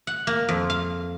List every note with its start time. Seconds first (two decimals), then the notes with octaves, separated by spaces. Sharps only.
0.07 F#5
0.27 A#3
0.49 F2
0.70 F5